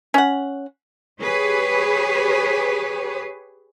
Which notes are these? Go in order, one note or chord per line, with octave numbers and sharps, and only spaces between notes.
C#4 F#5
G4 G#4 B4 C#5